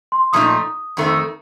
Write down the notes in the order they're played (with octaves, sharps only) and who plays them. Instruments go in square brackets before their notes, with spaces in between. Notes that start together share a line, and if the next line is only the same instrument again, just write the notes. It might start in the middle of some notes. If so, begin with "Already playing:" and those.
[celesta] C6
[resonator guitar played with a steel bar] A#2 F3 A3 D#4 [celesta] D#6
[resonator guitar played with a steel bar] F2 D#3 A3 C4